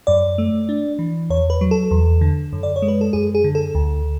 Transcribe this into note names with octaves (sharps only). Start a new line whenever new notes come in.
F#2 D5
A3
D4
E3
E2 C#5
B4
F#3
A4
E2
D3
F#2
D5
C#5
G#3
B4
A4
F#2 G#4
G#4
D3
A4
D2